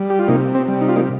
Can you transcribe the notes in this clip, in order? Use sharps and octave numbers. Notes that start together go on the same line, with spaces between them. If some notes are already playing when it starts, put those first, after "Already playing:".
Already playing: G3
G4
F4
C3 A#3 D#4
C4
G3
D#4
F4
A#3 D#4